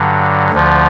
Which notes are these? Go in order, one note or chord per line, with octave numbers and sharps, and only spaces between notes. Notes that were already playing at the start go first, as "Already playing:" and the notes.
Already playing: G2 D3 F#3
D2 D3 F3